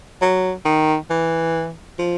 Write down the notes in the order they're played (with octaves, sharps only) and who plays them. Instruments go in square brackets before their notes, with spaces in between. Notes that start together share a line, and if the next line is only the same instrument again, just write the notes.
[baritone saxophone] F#3
D#3
E3
F3